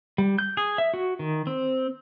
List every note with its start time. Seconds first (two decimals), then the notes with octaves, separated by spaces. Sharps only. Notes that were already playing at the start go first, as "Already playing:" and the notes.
0.18 G3
0.39 G6
0.57 G#4
0.78 E5
0.94 F#4
1.19 D#3
1.47 C4